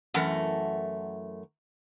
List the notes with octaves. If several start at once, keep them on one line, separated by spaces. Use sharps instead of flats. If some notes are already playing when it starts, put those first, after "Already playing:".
F#2 E3 A3 A#4 F#5